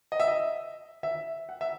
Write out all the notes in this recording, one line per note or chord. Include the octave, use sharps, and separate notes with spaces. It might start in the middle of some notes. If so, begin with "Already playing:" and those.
D#5
E5
D#5
E5
F#5
E5